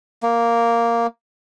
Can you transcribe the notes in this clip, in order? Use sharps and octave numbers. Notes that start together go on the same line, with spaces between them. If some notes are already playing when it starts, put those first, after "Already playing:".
A#3